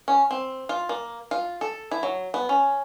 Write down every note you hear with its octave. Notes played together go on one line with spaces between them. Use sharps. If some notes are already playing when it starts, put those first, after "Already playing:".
C#4
C4
F4
A#3
F4
A4
E4
F#3
B3
C#4